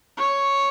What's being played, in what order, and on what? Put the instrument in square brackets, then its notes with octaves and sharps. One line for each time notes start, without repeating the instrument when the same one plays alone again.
[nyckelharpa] C#5